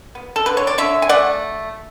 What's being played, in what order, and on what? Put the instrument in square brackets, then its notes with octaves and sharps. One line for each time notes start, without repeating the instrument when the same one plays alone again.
[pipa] B3
A4
D3 B4
C#5
D5
D3 C#5 E5
G#5
A3 D5 F#5